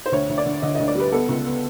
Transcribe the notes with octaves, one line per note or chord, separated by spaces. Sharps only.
C5
D2 C#5
D2
D5
D3
D3 D#5
D2 D#5
D5
G3 B4
B3 A4
C#2
B3